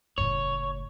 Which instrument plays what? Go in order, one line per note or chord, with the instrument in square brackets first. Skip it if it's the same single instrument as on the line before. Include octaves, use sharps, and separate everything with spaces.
[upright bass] F#1 A2 [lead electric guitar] C#5